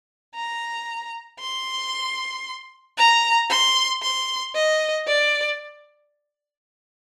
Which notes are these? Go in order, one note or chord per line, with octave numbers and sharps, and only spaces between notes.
A#5
C6
A#5
C6
C6
D#5
D5